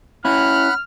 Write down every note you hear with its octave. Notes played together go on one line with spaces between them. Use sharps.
C#4 E4 F#5 B5 F6 F#6